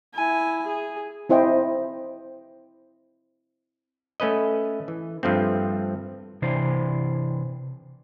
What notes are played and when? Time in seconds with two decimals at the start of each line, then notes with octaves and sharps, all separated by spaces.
0.14 E4 G#5
0.66 G#4
1.29 C4 E4 C5 D#5 G5
4.20 A3 C#4 B4 D#5
4.88 E3
5.23 G2 F3 A3 C4
6.42 C3 E3 D4 C5